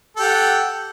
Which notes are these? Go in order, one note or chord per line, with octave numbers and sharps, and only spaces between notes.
G4 A4 F#5